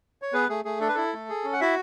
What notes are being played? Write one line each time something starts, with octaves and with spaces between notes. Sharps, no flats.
C#5
B3 G#4 B4
A3 G#4
A3 G#4
D4 A4
B4
E4 A4
A3
G#4
C#4
F#5
E4 F#4 E5